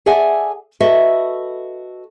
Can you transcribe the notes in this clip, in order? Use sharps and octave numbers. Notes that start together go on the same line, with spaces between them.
G#4 A4 D5 E5 F#5 G#5
F#4 A4 B4 D#5 E5